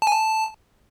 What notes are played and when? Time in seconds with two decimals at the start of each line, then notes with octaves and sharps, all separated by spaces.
0.02 A5
0.07 G#5
0.12 A5